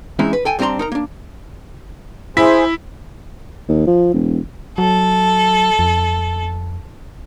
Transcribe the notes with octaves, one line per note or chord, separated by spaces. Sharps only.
E3 G#3 C4 C#4 D#4 E4
B4
A4 G5 G#5
G2 C4 D4 G#4 A#5 C6
D#4 A#4 A#5
A#3 D4
E4 G#4 C5 B6
D#2
F3
E1
F#3 A4
F2